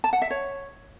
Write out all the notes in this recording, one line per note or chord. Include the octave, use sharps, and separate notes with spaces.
A5
F#5
E5
C#5